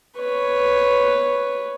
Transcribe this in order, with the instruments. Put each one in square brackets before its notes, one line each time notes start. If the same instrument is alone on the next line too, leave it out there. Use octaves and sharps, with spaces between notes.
[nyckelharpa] B4 C#5